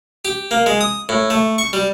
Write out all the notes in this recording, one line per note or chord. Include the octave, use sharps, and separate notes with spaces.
G4
A#3
G#3
D#6
A2
A3
C#6
G3